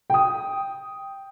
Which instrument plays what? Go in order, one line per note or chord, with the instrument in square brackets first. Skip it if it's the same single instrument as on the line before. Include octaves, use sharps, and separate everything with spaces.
[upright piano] G5 D#6